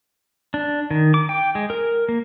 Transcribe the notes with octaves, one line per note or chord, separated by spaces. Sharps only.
D4
D#3
D6
G5
G#3
A#4
A#3